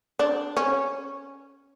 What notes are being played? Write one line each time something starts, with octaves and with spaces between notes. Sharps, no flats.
D4
C#4